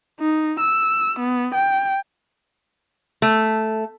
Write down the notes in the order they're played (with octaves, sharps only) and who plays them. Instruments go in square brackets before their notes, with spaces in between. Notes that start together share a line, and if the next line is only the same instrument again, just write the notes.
[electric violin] D#4
E6
B3
G5
[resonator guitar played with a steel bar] A3